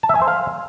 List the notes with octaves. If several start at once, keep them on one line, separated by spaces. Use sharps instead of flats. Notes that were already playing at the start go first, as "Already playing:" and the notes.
A5
E5
G#5
C5
F5